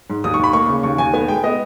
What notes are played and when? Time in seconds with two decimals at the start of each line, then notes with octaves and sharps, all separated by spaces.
0.10 G#2
0.24 D#2 D#6
0.34 C#6
0.39 D#2 B5
0.53 A#3 C#6
0.69 C#3
0.83 D#2 C#6
0.98 D#2 G#5
1.14 B3 G#5
1.28 G#3 G5
1.44 B3 D#5